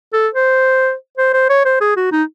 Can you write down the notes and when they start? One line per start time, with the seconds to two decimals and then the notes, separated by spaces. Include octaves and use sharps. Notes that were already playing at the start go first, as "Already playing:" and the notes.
0.13 A4
0.34 C5
1.18 C5
1.34 C5
1.49 C#5
1.65 C5
1.81 G#4
1.96 F#4
2.12 D#4